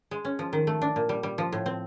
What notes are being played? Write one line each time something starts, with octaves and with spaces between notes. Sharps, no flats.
G#3
C#4
F3
D#3
A3
D4
A#2
G3
G3
F3
A2
C4